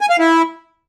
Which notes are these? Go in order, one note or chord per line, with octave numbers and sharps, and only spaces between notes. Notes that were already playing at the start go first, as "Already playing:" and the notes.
G#5
F5
E4